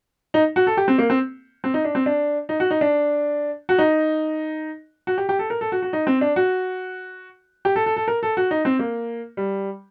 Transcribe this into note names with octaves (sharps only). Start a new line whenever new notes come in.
D#4
F#4
A4
G4
C4
A#3
C4
C4
D#4
D4
C4
D4
D#4
F#4
D#4
D4
F#4
D#4
F#4
G4
G4
A4
A#4
A4
F#4
F#4
D#4
C4
D4
F#4
G4
A4
A4
A4
A#4
A4
F#4
D#4
C4
A#3
G3